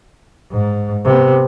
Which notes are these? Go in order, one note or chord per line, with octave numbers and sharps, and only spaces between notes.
G#2
C3 B3